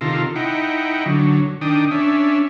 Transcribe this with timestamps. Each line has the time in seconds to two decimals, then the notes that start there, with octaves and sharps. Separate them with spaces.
0.01 C3 D#3 F4 A4 A#5
0.36 D#4 E4 F#5 G5
1.06 D3 F#3
1.61 D#3 D4 G5 D#6
1.91 C#4 D4 E5